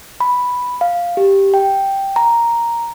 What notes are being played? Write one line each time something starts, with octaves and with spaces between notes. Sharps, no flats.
B5
F5
G4
G5
A#5